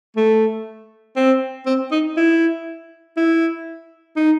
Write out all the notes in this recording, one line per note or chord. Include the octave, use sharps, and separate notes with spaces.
A3
C4
C4
D#4
E4
E4
D#4